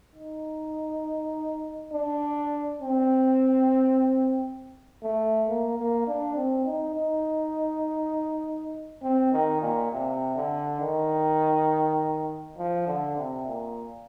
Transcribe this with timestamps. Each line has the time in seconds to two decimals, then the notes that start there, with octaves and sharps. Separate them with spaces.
0.15 D#4
1.93 D4
2.82 C4
5.03 A3
5.48 A#3
5.78 A#3
6.07 D4
6.36 C4
6.66 D#4
6.95 D#4
9.03 C4
9.32 D#3
9.62 A#2
9.92 C3
10.36 D3
10.80 D#3
12.58 F3
12.87 D3
13.17 C3
13.47 A#2